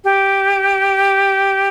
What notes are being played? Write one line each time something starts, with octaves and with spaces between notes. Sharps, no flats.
G4